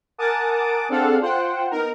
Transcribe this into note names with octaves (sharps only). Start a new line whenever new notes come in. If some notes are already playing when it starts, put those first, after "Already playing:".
A#4 F#5 G#5 A5 D6 D#6
C4 D4 G#4 A4 F5 F#5
F4 C5 F#5 G5
B3 D#4 A#4